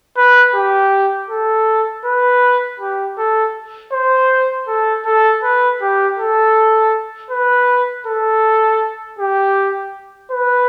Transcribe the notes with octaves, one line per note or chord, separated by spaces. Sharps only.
B4
G4
A4
B4
G4
A4
C5
A4
A4
B4
G4
A4
B4
A4
G4
B4